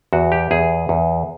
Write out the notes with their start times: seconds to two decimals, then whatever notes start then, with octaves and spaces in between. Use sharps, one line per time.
0.13 E2 F#4
0.32 G4
0.51 E2 G#4
0.89 E2